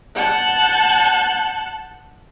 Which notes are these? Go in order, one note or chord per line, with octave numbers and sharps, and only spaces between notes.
F#5 A5 F#6 G6